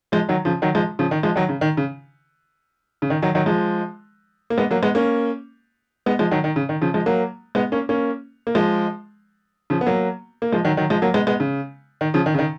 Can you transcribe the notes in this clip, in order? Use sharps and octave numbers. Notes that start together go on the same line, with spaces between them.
F3 G#3
D#3 F#3
C#3 F3
D#3 F#3
F3 G#3
C#3 F3
D#3
F3 G#3
D#3 F#3
C#3
D#3
C#3
C#3
D#3
D#3 F#3
D#3 F#3
F3 G#3
A#3
G#3 B3
F#3 A#3
G#3 B3
A#3 C#4
G#3 B3
F3 G#3
D#3 F#3
D#3
C#3
D#3
C#3 F3
F3 G#3
F#3 A#3
G#3 B3
A#3 C#4
A#3 C#4
A#3
F3 G#3
C#3 F3
B3
F#3 A#3
A#3
F3 G#3
D#3 F#3
D#3 F#3
F3 G#3
F#3 A#3
G#3 B3
G#3 B3
C#3
D#3
C#3 F3
D#3
C#3
D#3